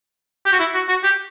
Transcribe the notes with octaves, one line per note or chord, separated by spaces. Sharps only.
G4
F#4
E4
F#4
F#4
G4